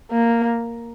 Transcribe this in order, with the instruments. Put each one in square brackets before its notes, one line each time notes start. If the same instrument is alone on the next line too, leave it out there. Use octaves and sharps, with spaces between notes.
[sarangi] A#3